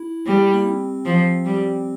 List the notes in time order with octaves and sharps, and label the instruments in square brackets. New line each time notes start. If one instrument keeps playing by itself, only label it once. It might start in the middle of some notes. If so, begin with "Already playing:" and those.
Already playing: [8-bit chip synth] E4
[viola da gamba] G3
[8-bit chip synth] A#3
C4
[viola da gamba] F3
G3